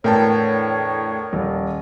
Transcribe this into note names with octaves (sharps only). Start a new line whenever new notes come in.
E2 A2 D3 A#4 C#5 G5 A5
D#1